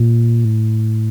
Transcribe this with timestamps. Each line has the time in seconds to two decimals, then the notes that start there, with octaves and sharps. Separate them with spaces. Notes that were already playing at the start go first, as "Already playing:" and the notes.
Already playing: A#2
0.45 A2